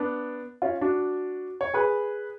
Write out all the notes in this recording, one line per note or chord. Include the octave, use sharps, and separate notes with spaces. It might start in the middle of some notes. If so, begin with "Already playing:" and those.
Already playing: B3 D4
C#4 F4
D4 F#4
C#5
G#4 B4